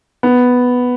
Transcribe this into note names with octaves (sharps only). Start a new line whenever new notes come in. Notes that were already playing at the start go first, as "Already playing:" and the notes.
B3